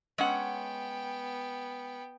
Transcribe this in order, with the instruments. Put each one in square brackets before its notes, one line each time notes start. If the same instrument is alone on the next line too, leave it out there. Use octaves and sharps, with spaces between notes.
[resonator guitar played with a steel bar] G#3 C#4 F#5 [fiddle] B3 G5